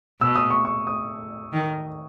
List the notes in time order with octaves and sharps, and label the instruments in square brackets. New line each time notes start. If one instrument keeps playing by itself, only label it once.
[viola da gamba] B2 [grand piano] E6
[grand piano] D#6
C#6
C#6
D#6
[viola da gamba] D#3